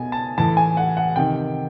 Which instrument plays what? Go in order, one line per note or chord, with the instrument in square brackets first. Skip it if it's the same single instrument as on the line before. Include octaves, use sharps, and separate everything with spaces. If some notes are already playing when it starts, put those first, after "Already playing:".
Already playing: [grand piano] B2 G#5
A5
A2 E3 A5
G#5
F#5
F#5
C3 D#3 G5